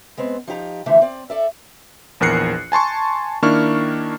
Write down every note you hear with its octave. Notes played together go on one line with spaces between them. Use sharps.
G#3 B3 C4
F3 D#4 G4 A#5
D2 D3 E3 F3 A3 E5
C4 D5
A4 D5 E5
A#1 E2 A#4 F#6 C7 C#7
G#5 A5 C6 C#6
D#3 A#3 D4 E4 C#6 F6